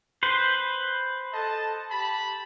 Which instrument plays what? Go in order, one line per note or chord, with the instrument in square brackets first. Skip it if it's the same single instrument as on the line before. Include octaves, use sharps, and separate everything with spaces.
[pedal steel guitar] B4 C5
[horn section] A4 D#5 A5
G4 A5 B5